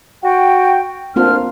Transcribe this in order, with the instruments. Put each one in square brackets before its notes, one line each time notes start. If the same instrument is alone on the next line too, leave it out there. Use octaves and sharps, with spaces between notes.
[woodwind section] F#4 G5
[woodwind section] D2 D4 F6 [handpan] A#3 C4 F4